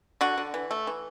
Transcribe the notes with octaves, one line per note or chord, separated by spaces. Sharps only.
D3 F#4
D3
E3
A3
E3